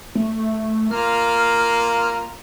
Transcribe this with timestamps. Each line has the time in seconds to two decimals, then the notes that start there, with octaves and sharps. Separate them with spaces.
0.15 A3
0.91 A#3 F4 A#5 F6